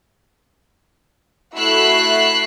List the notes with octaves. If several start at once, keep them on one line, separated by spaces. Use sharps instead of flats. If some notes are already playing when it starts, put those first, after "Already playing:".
A3 E4 F#4 E6 F#6 C7